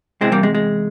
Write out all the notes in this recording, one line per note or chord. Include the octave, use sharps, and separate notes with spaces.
E2 C3 E3 G#3 C4
G3 A#3
G#3
G#3